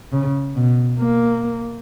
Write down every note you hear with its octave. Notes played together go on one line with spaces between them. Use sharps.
C#3
B2
A#3